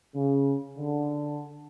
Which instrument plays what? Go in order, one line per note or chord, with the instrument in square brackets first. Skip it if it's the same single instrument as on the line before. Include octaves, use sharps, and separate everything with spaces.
[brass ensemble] C#3
D3